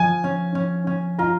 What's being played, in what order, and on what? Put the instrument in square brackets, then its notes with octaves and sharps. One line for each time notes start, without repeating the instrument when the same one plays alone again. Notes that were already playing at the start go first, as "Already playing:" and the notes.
Already playing: [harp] F3 [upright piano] G#5
[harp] C#4
C#4
C#4
[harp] F4 [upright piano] A#5